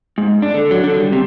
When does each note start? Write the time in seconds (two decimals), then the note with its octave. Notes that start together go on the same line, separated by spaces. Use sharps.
0.18 G#2
0.42 D4
0.54 D3
0.71 F#3
0.84 D3
0.99 G3
1.13 C3